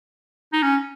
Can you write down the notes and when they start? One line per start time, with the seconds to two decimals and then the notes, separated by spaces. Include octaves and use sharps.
0.53 D#4
0.63 C#4